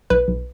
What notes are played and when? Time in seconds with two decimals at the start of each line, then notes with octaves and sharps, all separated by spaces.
0.10 B1 B4
0.28 B1